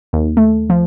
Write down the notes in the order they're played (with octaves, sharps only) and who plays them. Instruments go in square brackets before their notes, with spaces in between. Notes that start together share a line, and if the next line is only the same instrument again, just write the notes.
[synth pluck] D#2
A3
F3